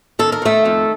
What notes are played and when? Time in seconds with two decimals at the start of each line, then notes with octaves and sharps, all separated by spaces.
0.19 D#3 A4
0.32 A#4
0.42 D#3 A3 A4
0.65 F2